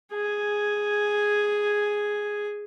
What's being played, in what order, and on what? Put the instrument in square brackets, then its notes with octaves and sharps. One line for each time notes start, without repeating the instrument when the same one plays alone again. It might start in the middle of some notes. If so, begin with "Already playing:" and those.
[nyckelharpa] G#4 G#5